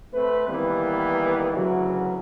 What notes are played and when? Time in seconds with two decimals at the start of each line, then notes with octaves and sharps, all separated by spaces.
0.14 A3 C4 B4
0.48 D#3 E3 G3 A#3 B3
1.53 D2 C#3 E3 F#3